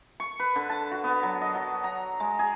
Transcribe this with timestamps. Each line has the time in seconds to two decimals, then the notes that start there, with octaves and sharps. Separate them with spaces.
0.20 C#6
0.39 B4
0.56 D3
0.70 A5
0.91 F#4
1.04 B3
1.23 F#3
1.41 D#5
1.55 F#3
1.84 A#5
2.20 G#3
2.39 G#4